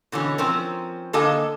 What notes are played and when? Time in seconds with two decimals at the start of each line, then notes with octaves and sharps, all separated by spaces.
0.12 B2 D3 E3 C#4
0.38 F3 C4 C#4 A#4
1.13 D3 A#3 A4 D#5 G#5